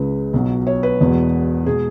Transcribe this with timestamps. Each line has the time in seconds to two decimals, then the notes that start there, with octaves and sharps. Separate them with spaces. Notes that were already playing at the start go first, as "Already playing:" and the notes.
Already playing: C#2 C#3 G#3 B4
0.33 B1 B2 F#3
0.67 C#5
0.83 B4
1.00 E1 E2 B2
1.66 B2 G#3 G#4